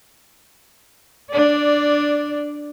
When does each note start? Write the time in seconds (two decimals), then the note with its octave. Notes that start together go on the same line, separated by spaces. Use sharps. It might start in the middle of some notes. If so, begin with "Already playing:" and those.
1.31 D4 D5